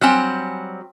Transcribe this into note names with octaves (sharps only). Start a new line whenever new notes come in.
F#3 G3 C4 G#5 F6 F#6